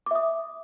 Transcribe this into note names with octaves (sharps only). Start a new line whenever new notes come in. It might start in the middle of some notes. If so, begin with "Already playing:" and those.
E5 D6 D#6